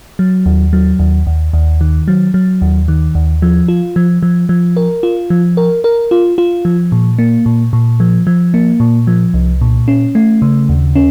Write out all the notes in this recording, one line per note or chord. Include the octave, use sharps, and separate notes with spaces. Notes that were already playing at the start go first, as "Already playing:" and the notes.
F#3
D#2
F#3
D#2
D#2
D#2
D#3
F#3
F#3
D#2
D#3
D#2
F3
F4
F3
F3
F3
A#4
F4
F3
A#4
A#4
F4
F4
F3
A#2
A#3
A#2
A#2
F3
F3
A#3
A#2
F3
C2
A#2
C#4
A3
C#3
D#2
C#4